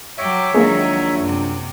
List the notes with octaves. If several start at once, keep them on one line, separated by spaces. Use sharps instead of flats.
F#3 G4 C#5 E5
A#1 D#3 F#3 G#3 A#3
F#2 C3